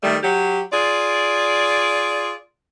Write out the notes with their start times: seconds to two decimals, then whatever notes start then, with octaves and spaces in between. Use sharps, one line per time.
0.03 D#3 G3 A3
0.23 F#3 G4
0.73 F4 G#4 D5